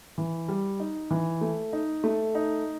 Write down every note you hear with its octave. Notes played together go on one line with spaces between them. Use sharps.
E3
G3
D#4
E3
A3
D#4
A3
D#4